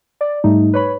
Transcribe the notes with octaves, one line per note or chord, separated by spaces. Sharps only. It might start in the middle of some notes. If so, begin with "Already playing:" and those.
D5
G#2 G3 A3 D#4
B4 C#5 B5